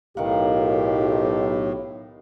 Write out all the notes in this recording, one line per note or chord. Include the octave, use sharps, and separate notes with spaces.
B1 A2 D#3 G4 F5 F#5